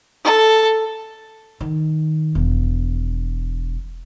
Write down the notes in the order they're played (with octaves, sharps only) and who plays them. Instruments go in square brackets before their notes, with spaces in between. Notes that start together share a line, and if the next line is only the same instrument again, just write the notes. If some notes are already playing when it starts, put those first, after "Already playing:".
[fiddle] A4
[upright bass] D#3
E1